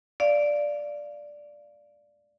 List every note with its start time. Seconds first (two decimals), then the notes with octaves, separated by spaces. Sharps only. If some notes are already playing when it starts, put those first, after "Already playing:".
0.20 D5 F5